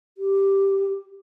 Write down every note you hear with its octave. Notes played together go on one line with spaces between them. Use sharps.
G4